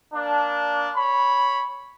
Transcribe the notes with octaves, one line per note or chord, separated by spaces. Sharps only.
A#3 D4
C#5 B5